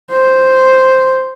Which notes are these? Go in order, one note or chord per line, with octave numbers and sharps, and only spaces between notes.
C5